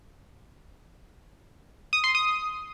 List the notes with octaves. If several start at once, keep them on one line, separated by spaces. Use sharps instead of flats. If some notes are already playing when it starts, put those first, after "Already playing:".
D#6
C6
D#6